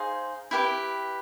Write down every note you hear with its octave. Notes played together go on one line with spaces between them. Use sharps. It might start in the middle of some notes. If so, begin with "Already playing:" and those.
Already playing: D#4 G#4 C5 F5
E4 G4 B4